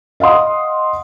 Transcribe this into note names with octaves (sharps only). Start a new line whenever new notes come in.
D#5 F5 F#5 C6 D#6